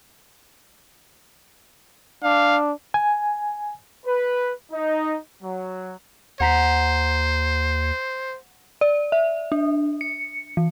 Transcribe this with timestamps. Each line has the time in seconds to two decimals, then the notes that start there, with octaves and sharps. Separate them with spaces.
2.23 D4 F5
2.94 G#5
4.05 B4
4.72 D#4
5.42 F#3
6.40 D#2 C5 F#5 A#5 B6
8.81 D5
9.12 E5
9.52 D4
10.01 C#7
10.57 E3